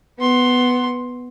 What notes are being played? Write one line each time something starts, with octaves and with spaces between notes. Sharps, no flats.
B3 C6